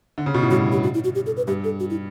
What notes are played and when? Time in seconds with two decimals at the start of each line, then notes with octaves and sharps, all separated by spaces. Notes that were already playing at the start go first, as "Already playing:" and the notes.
0.18 D3
0.26 C#3
0.34 B2
0.42 A2
0.51 G2 F#4
0.72 G4
0.83 F#4
0.94 E4
1.04 F#4
1.15 G4
1.26 A4
1.37 B4
1.47 G2 G4
1.64 A4
1.80 F#4
1.90 E4